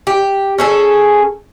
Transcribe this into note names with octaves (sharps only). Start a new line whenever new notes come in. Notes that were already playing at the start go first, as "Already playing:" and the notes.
G4
C#4 G#4 A4